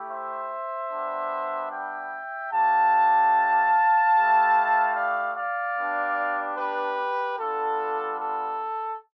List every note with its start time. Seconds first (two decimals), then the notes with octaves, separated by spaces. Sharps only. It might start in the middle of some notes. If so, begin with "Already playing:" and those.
Already playing: A3 E4 G4
0.10 C5 E5
0.91 G3 B3 D4 G4
1.72 E5 G5
2.52 A3 D4 G4 F5 A5
4.15 A3 E4 G4
4.95 D5 F5
5.36 D5 F5
5.76 B3 D4 G4
6.58 G4 B4
7.39 G3 B3 D4 F4 A4
8.20 A4